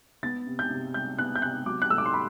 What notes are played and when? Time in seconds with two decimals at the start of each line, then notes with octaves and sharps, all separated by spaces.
0.23 B3 A6
0.47 C3
0.59 G6
0.70 C3
0.94 G3 G6
1.19 B3 F#6
1.36 G6
1.42 C3 F#6
1.66 F#3 D6
1.82 F#6
1.90 A3 E6
1.98 D6
2.06 C6
2.14 B5